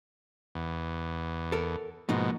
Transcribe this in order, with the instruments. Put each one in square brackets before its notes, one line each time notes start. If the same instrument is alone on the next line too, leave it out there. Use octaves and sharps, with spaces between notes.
[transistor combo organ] E2
[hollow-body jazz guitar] A4 A#4
[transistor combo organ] G#2 B2 [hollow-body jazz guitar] F3 A#3 D#4